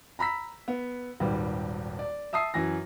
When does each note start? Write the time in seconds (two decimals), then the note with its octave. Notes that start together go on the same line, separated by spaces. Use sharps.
0.19 A#5 B5 E6 B6
0.68 B3
1.20 D#1 G#1 D#2 G3 B4
1.99 D5
2.33 E5 A5 D#6 E6 C7
2.54 F#2 E3 G#5 A#6